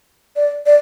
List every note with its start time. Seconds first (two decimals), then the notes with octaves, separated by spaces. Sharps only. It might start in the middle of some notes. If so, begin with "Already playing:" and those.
0.36 D5
0.66 D5